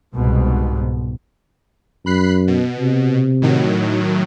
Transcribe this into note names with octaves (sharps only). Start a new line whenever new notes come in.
C2 G#2 B2
F#2 B5 F#6 C7
B2
C3
A2 D#3 F#3